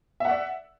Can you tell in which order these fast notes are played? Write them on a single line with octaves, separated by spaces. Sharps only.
E5 F#5 D5